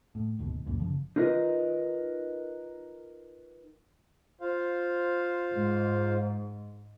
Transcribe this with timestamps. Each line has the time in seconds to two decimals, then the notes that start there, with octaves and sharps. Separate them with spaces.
0.15 A2
0.39 D#1 D2 G#2 B2
0.66 C#2 F#2 A#2
0.80 F#1 C#3 F3
1.16 D#4 F4 A#4 B4 D#5
4.41 F4 C5 F5
5.54 G#2